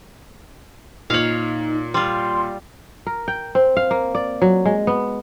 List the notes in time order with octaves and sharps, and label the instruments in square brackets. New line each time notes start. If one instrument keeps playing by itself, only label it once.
[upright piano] A#2 F#7 [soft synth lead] D#4 [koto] C#5 F5
[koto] G3 F4 [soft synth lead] C6
[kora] A#4
G5
C4
F5
A#3
D5
F#3
G#3
B3